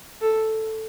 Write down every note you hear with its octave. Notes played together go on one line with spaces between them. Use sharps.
A4